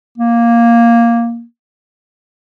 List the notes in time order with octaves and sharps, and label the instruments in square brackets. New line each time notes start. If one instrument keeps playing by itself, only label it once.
[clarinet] A#3